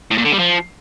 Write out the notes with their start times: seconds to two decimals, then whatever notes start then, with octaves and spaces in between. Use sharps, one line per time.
0.11 A2
0.18 A#2
0.25 D3
0.32 G3
0.39 F3